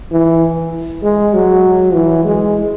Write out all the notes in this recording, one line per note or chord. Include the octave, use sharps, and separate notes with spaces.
E3
G#3
F#3
E3
G#3